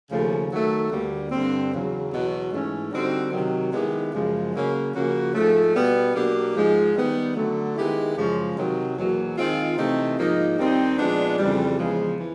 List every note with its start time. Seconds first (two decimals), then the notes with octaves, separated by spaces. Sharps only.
0.11 D#2 C#3 F3 A3
0.51 D#3 F#3 A3
0.91 D2 D3 G3 A#3
1.31 G2 D3 G3 C4
1.72 E2 C#3 F#3
2.11 E2 B2 F#3
2.52 G#2 E3 A3 C#4
2.92 D3 G3 C4 D#4 F#4
3.32 C3 D#3 F#3
3.72 D#3 G#3 B3 E4 G4
4.12 F#2 C#3 F3 G#3
4.54 C#3 F#3 A#3 C#4
4.93 C#3 F3 A#3 C#4 F#4
5.34 G#2 F3 A3
5.75 B2 G3 B3
6.15 B2 F#3 A#3 D4 G4
6.55 G#2 F3 G#3
6.95 D#3 G3 B3
7.35 D3 F#3 A3
7.76 D#3 G#3 B3 E4 G4
8.16 F#2 C#3 F3 G#3 C#4
8.55 C3 D#3 F#3
8.96 E2 B2 F#3 A#3
9.37 D#3 G#3 C4 F4
9.76 C3 E3 A3 C4 D#4
10.17 G#2 F3 A#3 D#4
10.58 D#2 D#3 G3 C4 D#4
10.98 A#2 F3 G#3 B3 D4
11.38 F2 C#3 E3 G3
11.78 E2 C#3 F3 G#3 B3
12.19 E3